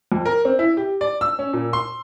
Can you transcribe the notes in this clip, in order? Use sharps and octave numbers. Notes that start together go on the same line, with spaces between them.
F2
A#4
C4
E4
G4
D5
E6
C#4
A#2
C6